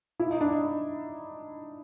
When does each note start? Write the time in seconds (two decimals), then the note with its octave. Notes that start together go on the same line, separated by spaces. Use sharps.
0.20 E4
0.31 D#4
0.41 D4
0.52 D#4